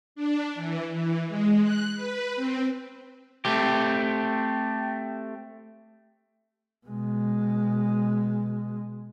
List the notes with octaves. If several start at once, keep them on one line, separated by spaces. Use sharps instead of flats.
D4
E3
E3
G#3
F#6
B4
C4
A3 C4 G4
B2 G#3